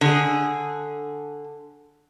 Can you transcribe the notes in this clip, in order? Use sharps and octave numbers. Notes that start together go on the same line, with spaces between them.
D3 G#4